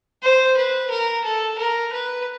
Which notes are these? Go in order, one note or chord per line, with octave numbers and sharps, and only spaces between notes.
C5
B4
A#4
A4
A#4
B4